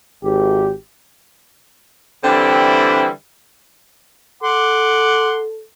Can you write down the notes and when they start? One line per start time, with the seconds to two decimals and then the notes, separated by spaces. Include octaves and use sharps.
0.23 G#1 G4
2.24 D3 E3 G3 C4 D4 E4
4.43 A4 F#5 C6 D6